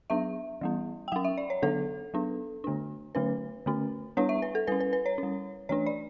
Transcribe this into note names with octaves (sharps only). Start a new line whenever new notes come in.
F#3 B3 D4 E5
E3 G3 B3
G5
F#3 C#4 F#5
E5
D5
C#5
D3 F#3 B3 D4 A4
F#3 B3 D4
D3 A3 D4
D3 F#3 A3 C#4 B4
D3 A3 C#4
G3 B3 D4 C#5
E5
B4
A4
G3 C#4 B4
B4
B4
C#5
G3 C#4
E3 A3 D4 C#5
D5